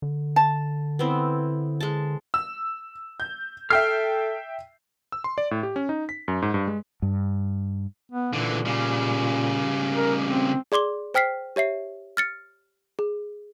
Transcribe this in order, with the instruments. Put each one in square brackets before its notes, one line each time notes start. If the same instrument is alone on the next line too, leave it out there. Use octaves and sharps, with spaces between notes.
[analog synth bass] D3
[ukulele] A5
[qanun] B3 C4 E4
G#3 A5
[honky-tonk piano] E6
G6
[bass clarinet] A4 [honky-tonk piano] E5 G5 C7 [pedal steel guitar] F6
[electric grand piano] E6
C6
D5
A2
G4
C#4
D#4
B6
F#2
G#2
G2
G#3
[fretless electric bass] G2
[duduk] B3
[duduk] A#2 [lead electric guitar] D3 E3
[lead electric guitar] C#3 G3
[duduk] A#4
C4
[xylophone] G#4 D5 C6 D6 G7
C5 G5 F6 B6 C7
G4 C#5 E5 C7
F6 A6 C#7
G#4